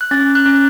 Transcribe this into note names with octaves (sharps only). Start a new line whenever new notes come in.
F#6
C#4 A6
F#6
C#4